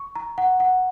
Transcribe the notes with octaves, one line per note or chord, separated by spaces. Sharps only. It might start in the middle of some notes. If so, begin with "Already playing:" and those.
Already playing: C#6
A#5
F#5
F#5